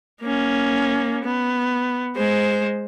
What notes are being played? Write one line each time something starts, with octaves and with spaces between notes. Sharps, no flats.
A#3 C#4
B3
G#3 C5